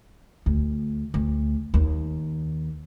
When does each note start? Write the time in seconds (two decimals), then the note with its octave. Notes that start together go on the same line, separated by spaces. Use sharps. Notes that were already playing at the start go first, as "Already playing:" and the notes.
0.46 D2
1.14 D2
1.74 D#2